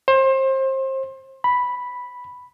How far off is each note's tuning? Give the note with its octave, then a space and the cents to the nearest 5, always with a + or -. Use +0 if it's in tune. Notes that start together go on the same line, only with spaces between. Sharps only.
C5 +30
B5 -5